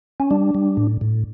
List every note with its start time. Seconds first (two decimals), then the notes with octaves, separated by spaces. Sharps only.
0.20 C#4
0.31 G3 D4
0.55 G3
0.77 A2
1.01 A2